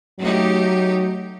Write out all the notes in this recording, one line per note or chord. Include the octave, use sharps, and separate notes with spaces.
F#3 A3 D#4 G4